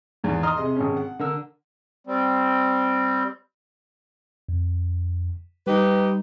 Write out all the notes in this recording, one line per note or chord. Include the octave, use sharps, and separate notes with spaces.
E2 G#2 D#3
D#5 A#5 C6 D#6 F6
C3 G#4 D#5 C6
G#1 G#3 C#4
F#5
D3 A#4 E6
G3 C4
F2
G3 D#4 G4 B4